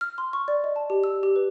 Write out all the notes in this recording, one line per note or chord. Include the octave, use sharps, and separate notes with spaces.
F6
C6
C#6
D5
D#5
A5
G4
E6
G4
B4